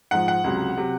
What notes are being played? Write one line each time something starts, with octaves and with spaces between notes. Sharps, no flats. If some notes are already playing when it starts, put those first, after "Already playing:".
G#2 F3 F#5
F#5
C#2 C3 F#3
C3 F#3